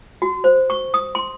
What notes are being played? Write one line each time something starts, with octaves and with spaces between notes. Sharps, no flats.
F#4
C5
C#6
D#6
C6